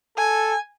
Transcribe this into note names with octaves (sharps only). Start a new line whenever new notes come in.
A4 G#5